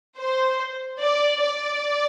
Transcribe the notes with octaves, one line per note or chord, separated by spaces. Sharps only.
C5
D5
D5